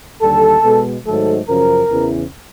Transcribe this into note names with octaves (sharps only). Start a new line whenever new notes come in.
D#2 D3 G3 A4
B2 G#3 B3
G#2 D#3 F#3 A3 A4
F#2 C#3 F3 A#4
E2 C#3 E3